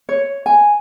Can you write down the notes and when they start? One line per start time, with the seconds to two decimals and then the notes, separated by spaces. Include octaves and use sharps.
0.09 C#5
0.46 G#5